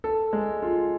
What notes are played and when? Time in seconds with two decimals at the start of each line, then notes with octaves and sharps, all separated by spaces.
0.04 A4
0.33 G#3
0.62 F4